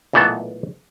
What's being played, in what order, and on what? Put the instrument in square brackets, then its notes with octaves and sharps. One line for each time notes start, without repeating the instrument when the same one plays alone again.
[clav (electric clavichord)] B1 A#2 E3 A3 B3 A5